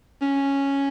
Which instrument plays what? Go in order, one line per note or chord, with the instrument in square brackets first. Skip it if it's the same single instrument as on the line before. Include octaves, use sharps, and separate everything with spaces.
[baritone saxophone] C#4